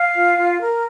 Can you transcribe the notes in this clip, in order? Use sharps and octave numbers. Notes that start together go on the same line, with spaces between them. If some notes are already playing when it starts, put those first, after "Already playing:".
Already playing: F5
F4
F4
A#4